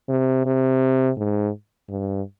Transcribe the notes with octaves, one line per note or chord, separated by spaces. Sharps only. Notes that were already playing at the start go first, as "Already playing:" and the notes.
C3
C3
G#2
G2